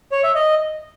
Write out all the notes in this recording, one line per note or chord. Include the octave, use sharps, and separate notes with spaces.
C#5
E5
D#5